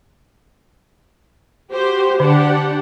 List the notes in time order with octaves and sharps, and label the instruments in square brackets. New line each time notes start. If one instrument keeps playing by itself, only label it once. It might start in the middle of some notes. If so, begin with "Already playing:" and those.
[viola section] F#4 G4 C5
[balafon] D3 [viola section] D4 G4 F#5